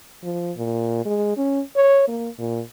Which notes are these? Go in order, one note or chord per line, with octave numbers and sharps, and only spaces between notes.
F3
A#2
G#3
C#4
C#5
A#3
A#2